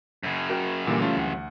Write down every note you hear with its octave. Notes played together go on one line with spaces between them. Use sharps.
F#2 C#3
F#4 A#4 G5
A#2 D3 E3 G3 A#3
A3 C#4 F4
D2 F#5